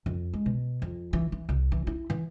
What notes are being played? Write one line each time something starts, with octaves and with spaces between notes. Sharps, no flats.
F2
G#3
B2
F2
E3
E3
C2
E3
E4
E3